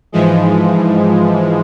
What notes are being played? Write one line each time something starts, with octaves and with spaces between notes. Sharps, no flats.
G#2 E3 F3 G#3